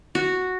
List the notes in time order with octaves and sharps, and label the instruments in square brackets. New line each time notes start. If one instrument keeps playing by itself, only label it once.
[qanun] F#4